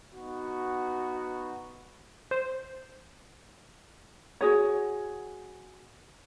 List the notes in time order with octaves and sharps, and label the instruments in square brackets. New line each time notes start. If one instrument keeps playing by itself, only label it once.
[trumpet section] B3 D#4 F#4
[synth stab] C5
[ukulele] F#4 G#4 C#5